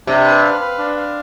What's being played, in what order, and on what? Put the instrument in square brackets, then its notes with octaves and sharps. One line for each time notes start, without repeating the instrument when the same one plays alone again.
[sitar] C3 [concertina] D4
[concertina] B4
F5
B4
D4
F5